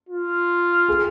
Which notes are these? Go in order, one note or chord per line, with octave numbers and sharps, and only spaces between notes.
F4
G#4